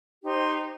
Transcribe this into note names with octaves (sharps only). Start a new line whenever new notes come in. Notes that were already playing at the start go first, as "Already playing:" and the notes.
D#4 G4 C5 C6